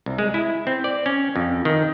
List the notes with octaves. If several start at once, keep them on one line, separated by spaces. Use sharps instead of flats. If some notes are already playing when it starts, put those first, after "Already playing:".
C2
G#3
E4
C4
D5
C#4
F2
D#3